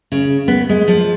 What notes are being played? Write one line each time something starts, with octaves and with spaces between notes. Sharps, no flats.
C#3
B3
G#3
F3